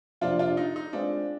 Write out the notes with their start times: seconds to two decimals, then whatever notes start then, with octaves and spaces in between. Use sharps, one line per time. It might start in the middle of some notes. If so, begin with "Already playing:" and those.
0.21 F2 C3 F3 A#3 D4 F4
0.39 D4 F4
0.57 D#4
0.76 D#4
0.93 G#3 C4 D4 F4